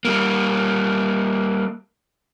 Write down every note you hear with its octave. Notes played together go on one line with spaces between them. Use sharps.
G3 A#3